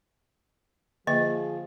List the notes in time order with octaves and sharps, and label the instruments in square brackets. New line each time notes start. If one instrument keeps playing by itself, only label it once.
[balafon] D3 A#3 E5 [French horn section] F3 G#4 [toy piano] D#5